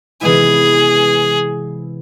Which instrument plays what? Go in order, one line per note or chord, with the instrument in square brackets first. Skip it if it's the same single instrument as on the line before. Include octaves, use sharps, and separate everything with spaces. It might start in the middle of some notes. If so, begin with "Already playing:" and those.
[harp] C3 E3 G#3 B3 E4 [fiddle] G#4